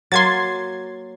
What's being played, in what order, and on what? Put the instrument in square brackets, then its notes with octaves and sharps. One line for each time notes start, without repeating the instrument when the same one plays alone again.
[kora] F#3 A#3 [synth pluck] C6 G#6 A6